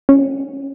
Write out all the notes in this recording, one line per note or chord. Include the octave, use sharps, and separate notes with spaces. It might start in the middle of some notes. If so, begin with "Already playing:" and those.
C#4